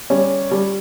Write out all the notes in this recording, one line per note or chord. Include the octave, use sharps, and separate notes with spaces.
G3 C#4 G4
G3